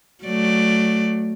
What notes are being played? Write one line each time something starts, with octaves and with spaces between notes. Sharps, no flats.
F#3 A3 D5